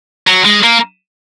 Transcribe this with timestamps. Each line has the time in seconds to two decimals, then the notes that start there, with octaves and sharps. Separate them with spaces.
0.27 F#3
0.45 G#3
0.64 A#3